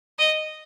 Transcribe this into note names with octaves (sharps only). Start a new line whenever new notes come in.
D#5